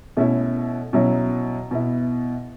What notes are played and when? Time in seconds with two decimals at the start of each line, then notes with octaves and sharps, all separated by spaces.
0.17 B2 A3 C#4 E4
0.93 B2 F#3 C#4 E4
1.71 B2 B3 E4